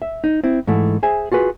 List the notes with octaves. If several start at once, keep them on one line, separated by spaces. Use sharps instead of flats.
E5
D#4
C4 E4
G#2 E3 A3
G#4 C5 E5 G#5
F4 F#4 G#4 B4